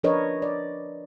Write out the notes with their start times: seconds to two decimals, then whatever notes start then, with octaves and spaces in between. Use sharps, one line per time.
0.03 F3 D4 A#4 B4 C#5 D#5
0.42 D5